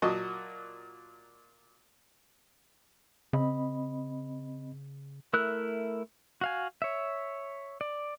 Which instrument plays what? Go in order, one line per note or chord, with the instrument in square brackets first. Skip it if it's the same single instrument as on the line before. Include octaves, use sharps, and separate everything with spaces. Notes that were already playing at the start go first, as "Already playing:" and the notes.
[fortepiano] A#2 F#3 F#4 D#5 A5 C#6
[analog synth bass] C#3 [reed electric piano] C4 D#5 B5
[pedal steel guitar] A3 E4 A#4 E6 F#6
F#4 F5 G#5
C#5 E5
D5